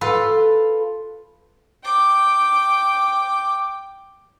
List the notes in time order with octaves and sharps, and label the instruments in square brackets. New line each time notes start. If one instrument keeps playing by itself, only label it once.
[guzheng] F4 A4 B4
[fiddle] G5 D6